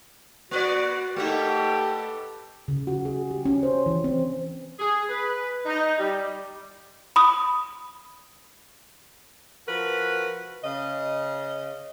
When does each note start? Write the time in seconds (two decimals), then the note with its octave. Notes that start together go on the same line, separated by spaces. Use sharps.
0.51 A#3 F#4 B4 D5
1.16 A3 B3 D#4 G4 A4
2.68 C#3
2.87 F#4
3.05 G#4
3.31 G4
3.45 C#4
3.63 C5
3.86 E3
4.04 C4
4.79 G#4
5.09 B4
5.66 D#4
5.98 G3
7.16 B5 D#6
9.68 F3 F#4 A#4 B4
10.63 C#3 D#5